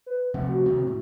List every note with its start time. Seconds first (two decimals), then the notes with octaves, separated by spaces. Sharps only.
0.06 B4
0.34 C3 F3 A3 F#5
0.49 F#4
0.65 C3 D#3
0.87 A2